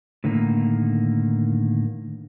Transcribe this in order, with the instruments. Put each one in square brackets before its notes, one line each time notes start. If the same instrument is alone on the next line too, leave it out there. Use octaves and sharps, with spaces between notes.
[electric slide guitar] A2 D3 D#3 A#3